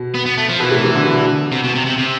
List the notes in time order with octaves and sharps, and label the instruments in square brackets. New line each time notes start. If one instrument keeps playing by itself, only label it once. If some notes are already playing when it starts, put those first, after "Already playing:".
Already playing: [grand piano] B2
[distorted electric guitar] B3
B3
A3
F3
[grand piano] B2 [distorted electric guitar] E3
[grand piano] A2 C3
A2 C3
B2 D3
B2 D3
[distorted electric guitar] C3
B2
C3
C3
C3